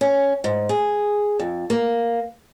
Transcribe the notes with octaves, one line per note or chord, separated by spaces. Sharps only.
C#4
G#2
G#4
F2
A#3